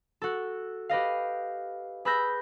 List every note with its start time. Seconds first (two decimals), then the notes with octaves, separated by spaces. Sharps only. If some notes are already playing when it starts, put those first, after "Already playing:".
0.22 F#4 A4
0.89 G4 B4 D#5 F5
2.05 G#4 B4 B5 E6 G6 A#6